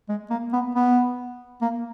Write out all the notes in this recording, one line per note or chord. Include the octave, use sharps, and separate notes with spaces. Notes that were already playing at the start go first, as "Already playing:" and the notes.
G#3
A#3
B3
B3
A#3